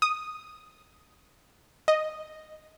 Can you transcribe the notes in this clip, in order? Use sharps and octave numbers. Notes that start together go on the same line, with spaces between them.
D#6
D#5